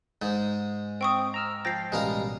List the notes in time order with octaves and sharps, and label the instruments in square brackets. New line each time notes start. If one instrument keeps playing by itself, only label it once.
[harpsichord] G#2 G#3
[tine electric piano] C4 [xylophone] G5 C#6 D#6
[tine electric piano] A#5 E6 F6
[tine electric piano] F3 G5 A6 [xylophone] A#6 C7
[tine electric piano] A1 B2 G3 [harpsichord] G#3 A#4 F5